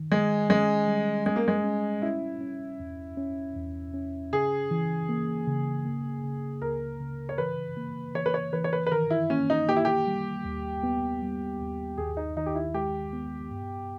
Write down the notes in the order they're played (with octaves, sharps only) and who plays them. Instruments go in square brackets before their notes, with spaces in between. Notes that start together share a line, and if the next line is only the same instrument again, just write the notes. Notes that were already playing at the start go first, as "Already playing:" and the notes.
Already playing: [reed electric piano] D#3
[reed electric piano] D#3 [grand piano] G#3
[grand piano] G#3 [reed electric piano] C#4
[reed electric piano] G3
[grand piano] G#3 [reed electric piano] C#4
[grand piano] A#3
G#3
[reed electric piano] C#4
[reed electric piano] C#4 [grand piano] E4
[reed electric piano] C#4
E2
C#4
E2
C#4
[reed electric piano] C#3 [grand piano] G#4
[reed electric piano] E3
A#3
C#3
A#3
C#3
[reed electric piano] C#2 [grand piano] A#4
[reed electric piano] C#3
[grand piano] C#5
[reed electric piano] E3 [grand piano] B4
[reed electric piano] A#3
[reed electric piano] E3 [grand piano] C#5
[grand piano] B4
C#5
[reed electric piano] E3 [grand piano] B4
[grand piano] C#5
B4
B4
[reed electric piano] D#3 [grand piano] A#4
[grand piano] E4
[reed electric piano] A#3 [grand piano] C#4
[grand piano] D#4
[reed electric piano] A#3 [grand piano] G4
[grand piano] E4
G4
[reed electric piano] G3
D#2
B3
G3
D#2
[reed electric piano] D#2 [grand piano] G#4
[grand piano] D#4
[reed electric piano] D#3 [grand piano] D#4
[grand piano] G4
E4
[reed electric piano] G#3 [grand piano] G4
[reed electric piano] B3
G2